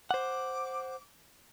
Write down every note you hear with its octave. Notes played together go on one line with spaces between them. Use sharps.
C5 F#5 D6